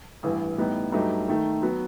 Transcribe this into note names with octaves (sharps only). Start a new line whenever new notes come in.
A1 G2 E3
A2 G3 B3 D#4
G2 F#3 A3 D#4 G4
D#3 A3 D#4
F#3 B3 F#4